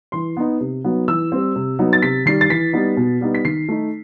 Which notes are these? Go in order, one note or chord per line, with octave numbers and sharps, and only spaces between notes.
E3 C6
B3 D#4
C3
F#3 B3 D#4
E3 E6
G3 C4
C3
F#3 B3 D#4
A6
C3 B6
D#3 G3 C7
A6
E3 B6
G3 B3 D#4
B2
G3 B3 D#4
B6
D#3 C7
A3 D#4